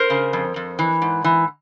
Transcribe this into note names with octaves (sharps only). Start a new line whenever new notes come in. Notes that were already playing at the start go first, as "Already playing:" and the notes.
Already playing: A#4 C5
C#3
F2
F2
E3
G#2
E3